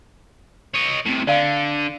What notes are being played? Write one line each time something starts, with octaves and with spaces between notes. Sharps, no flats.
C#5 D#5
A2 C3
D3 D5 F5